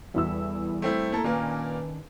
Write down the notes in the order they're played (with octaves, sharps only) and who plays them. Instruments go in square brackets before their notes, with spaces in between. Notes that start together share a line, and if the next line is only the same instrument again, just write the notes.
[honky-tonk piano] E2 E4 E6 [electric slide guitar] G3 A4 E5
[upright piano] A3 C4 E4
[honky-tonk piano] A#3 [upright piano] E4 A4 A#4
[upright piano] A#2 A#3 [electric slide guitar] D#3 C#4 D4 [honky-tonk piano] B4